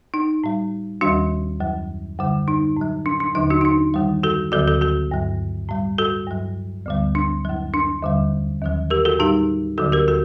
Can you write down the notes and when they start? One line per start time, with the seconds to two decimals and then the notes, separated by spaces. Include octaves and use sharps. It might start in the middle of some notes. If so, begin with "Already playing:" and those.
0.14 D#4
0.44 A2 G3
1.01 D#2 D#3 G3 D4 F#4
1.60 F#2 F#3
2.19 F#2 D3 G3
2.48 D#4
2.77 A2 F#3
3.06 D4
3.20 D4
3.35 D#2 D3 F#3 D#4
3.50 D4 F#4
3.61 D#4
3.65 D4
3.94 F#2 D#3 G3
4.23 F#4 A4
4.52 D2 D3 F#3 F#4 A4
4.68 F#4 A4
4.81 F#4 A4
5.11 G2 F#3
5.69 A2 G3
5.98 F#4 A4
6.27 G2 F#3
6.86 D2 D3 G3
7.15 D4
7.45 F#2 F#3
7.74 D4
8.02 D#2 D3 G3
8.62 D#2 D#3 F#3
8.90 G4 A#4
9.05 F#4 A4
9.19 A2 G3 D#4 G4
9.78 D2 D3 F#3 F#4 A4
9.92 G4 A#4
10.08 F#4 A4